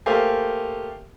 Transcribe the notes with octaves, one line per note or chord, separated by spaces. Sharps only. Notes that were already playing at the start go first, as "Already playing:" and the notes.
A3 A#3 G4 C5 F5 G#5